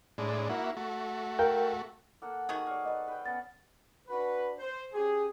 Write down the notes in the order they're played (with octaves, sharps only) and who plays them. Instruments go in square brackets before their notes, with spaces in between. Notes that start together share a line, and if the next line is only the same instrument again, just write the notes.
[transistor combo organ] A2 G#3 D4
A#3 E4 F#4
A3 F#4
[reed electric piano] A#4 F5 G5
[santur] A#3 A4 F#5
[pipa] D#3 F#4 G#4
[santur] C#5 D5 F5
[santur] B4 A5 [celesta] D#5
[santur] B4 G5
[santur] B3 C#4 F#5 [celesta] A6
[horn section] D4 F#4 B4
C5
C#4 G4 G#4